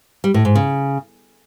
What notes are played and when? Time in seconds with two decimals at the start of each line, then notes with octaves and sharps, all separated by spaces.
0.24 G3
0.34 A2
0.45 G#2
0.55 C#3